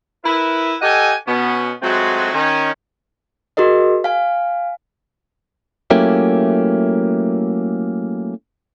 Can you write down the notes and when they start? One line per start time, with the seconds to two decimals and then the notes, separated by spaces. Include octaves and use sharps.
0.24 E4 A#4 B4
0.81 G4 A4 D#5 F#5 G#5
1.26 B2 B3 C#4
1.82 F#3 G#3 A3 C4 F4 F#4
2.33 D#3 C#4
3.57 F#4 G#4 A#4 D#5
4.04 F5 G#5
5.90 F#3 A3 A#3 C#4 E4 G4